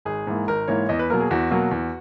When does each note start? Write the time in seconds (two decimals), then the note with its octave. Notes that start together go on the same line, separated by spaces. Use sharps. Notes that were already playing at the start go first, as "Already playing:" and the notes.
0.05 G#1 G#4
0.27 G#2 E3 A#3
0.47 G#1 A#4
0.68 G#2 E3 A#3 C#5
0.89 E2 D#5
0.99 B4
1.10 B2 F#3 A#3 A#4
1.20 G#4
1.31 E2 F#4
1.51 B2 F#3 A#3
1.71 E2